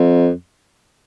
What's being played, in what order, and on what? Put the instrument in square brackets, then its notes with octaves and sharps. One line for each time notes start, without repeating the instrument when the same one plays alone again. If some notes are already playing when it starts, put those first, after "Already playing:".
Already playing: [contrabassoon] F2